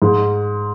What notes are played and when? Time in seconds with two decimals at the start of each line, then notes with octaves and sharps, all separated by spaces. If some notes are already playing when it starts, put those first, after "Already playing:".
0.02 G#2